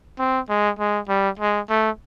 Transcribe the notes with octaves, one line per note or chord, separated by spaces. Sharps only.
C4
G#3
G#3
G3
G#3
A3